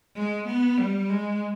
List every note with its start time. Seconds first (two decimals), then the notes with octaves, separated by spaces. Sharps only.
0.15 G#3
0.47 B3
0.78 G3
1.10 G#3